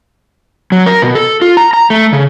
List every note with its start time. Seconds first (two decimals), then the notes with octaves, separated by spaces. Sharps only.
0.72 F#3
0.86 A#4
1.02 B2
1.15 A4
1.41 F4
1.57 A#5
1.74 A#5
1.90 A3
2.13 C#3